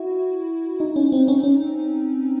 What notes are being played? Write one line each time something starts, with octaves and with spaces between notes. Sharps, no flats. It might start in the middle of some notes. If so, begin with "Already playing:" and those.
Already playing: E4 F#4
D#4
C#4
C4
C#4
C#4